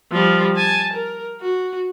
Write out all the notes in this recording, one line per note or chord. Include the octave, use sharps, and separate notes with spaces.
F3 G3
G#5 A5
A#4
F#4